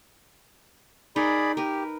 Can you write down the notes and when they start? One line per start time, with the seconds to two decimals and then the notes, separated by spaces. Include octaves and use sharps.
1.16 D#4 G#4 A#4 D5 B5
1.57 G4 A#4 B4